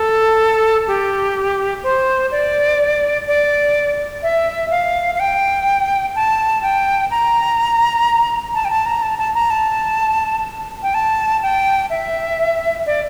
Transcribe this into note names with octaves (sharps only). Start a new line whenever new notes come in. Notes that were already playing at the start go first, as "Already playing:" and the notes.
Already playing: A4
G4
C5
D5
D5
E5
F5
F5
G5
A5
G5
A#5
A5
G5
A5
A#5
A5
A5
A#5
A5
G5
A5
G5
E5
D5